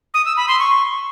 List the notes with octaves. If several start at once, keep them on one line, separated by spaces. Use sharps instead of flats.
D#6
E6
B5
C6
C#6